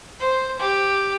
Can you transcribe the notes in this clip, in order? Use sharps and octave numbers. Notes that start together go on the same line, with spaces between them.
C5
G4